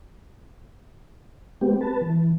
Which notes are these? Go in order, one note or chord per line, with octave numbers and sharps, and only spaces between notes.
G#3 B3 C4 G4
B4 A5
E3